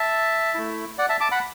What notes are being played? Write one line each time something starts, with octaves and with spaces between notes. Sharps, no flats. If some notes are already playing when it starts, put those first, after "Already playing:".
Already playing: E5 A5
A3 E4
D5 F#5
E5 A5
A5 D6
F#5 B5